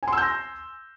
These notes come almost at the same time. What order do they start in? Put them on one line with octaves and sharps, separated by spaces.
G#5 C6 E6 G6 A#6